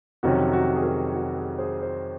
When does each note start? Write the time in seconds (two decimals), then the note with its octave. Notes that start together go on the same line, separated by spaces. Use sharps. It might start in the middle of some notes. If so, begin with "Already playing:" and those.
0.23 F2 C3 D#3 F#3 C#4 F#4
0.53 F#4
0.75 G#4
0.83 F#4 A#4
1.14 F#4
1.36 G#4
1.58 G#4 C5
1.82 G#4 C5